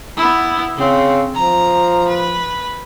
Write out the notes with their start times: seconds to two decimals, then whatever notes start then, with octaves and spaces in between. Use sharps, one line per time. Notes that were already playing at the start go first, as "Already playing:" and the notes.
0.17 B3 E4
0.77 C#3 C4
1.35 F3 A#5
2.08 B4